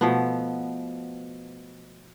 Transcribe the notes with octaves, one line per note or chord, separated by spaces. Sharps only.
B2 F3 A3 B3